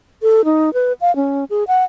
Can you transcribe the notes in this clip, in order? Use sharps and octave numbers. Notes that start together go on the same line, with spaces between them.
A4
D#4
B4
F5
C#4
G#4
F#5